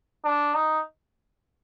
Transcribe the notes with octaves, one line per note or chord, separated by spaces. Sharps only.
D4
D#4